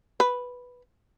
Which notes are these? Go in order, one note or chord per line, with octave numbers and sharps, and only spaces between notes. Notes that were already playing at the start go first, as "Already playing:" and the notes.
B4